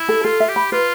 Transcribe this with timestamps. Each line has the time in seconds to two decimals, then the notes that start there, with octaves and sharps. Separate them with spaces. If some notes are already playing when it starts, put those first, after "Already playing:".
Already playing: E4
0.09 A4
0.25 F4 A4
0.40 E5
0.49 G4
0.56 B5
0.72 F4 B4